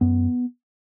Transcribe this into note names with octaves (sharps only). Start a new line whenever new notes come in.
F#2 B3